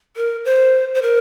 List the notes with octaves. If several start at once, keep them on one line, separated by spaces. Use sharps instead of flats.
A#4
C5
C5
A#4